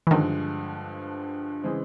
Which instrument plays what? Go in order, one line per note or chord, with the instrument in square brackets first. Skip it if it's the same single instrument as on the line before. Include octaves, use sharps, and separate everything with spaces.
[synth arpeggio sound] E3
[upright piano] G2 D3 F3 G#3 [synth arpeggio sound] D#3
[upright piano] C#3 E3 G#3 C4